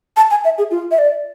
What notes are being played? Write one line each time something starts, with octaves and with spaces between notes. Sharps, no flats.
A5
G#5
E5
G#4
F4
E5
D5